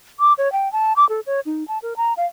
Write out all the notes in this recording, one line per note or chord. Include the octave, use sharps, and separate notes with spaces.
D6
C#5
G5
A5
D6
A4
C#5
D#4
A5
A#4
A#5
F5